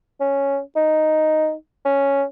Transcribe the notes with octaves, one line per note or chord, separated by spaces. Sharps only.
C#4
D#4
C#4